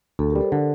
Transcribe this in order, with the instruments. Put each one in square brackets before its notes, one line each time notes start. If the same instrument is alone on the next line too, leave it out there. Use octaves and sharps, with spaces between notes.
[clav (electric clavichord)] D2 [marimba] A4
[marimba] G4 A#4
[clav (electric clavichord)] G3
[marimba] A4 C5
[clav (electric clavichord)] D3 [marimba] A4